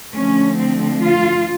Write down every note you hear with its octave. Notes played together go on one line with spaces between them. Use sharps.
D3 F3 A3 C#4
C4
F4